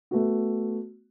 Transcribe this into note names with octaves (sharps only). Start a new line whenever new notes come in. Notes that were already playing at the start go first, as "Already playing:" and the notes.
A3 B3 F#4